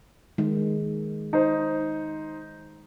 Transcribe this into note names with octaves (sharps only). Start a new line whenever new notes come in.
D#3 G#3
D#4 C5